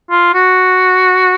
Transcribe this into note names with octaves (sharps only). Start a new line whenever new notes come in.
F4
F#4